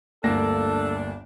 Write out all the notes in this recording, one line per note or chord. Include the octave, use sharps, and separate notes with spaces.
G1 D2 A#3 D4 A4 A#6